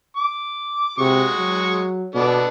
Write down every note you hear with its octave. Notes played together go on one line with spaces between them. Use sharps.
D6
C3 G#3 F#4 C#6
F#3
B2 B3 D4 A4